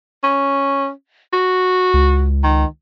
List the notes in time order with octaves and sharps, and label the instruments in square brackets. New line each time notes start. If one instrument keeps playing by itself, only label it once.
[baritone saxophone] C#4
F#4
[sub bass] C#2
[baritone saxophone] D#3